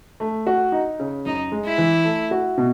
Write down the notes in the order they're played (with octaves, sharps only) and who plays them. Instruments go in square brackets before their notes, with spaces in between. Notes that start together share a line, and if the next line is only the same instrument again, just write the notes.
[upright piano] A3
F#4
D#4
C#3
[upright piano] F#2 [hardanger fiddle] D#4
[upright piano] G#3
[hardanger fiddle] E4
[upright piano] E3
A3
F#4
B2